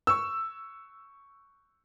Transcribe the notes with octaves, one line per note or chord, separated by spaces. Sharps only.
C#6 E6